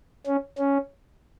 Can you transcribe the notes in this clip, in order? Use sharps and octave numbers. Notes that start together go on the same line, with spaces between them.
C#4
C#4